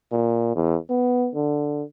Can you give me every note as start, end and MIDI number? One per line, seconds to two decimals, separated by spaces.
0.12 0.54 46
0.56 0.77 40
0.90 1.30 59
1.35 1.83 50